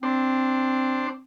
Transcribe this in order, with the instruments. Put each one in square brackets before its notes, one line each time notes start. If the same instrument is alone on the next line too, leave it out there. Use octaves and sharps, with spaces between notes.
[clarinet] C4 [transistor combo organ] D4 C5